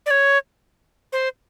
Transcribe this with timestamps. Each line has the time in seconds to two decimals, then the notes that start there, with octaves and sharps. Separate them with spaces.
0.06 D5
0.10 C#5
1.12 C5